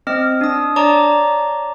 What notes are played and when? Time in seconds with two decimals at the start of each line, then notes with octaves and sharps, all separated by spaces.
0.07 C4 D#5 F6
0.41 D4 D#6
0.76 C#5 D5 A5 A#5 D6